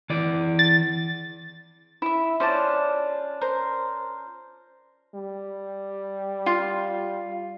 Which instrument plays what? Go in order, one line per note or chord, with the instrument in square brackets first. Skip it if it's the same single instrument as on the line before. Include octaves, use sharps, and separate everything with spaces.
[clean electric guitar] E3 D5
[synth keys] A6
[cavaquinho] E4 E5
[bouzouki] C#4 D4 F4 [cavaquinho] C5 D5 A5
[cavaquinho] A#4 C5
[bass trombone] G3
[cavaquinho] F4